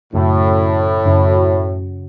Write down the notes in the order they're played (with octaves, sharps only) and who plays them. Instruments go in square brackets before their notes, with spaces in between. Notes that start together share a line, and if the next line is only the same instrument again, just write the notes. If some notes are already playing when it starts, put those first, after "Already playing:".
[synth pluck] F#2 C#3 F#3 C#4 F#4 [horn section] A2
[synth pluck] F#2 C#3 F#3 C#4 F#4